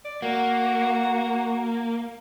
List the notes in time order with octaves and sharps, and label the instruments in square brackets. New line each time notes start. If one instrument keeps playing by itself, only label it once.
[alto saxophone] D5
[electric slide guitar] A#3 [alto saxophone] F#4